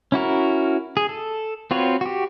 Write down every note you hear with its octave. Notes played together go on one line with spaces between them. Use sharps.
C#4 E4 F#4 A#4
G#4
A4
C4 F4 F#4 B4 C#5
F#4 G4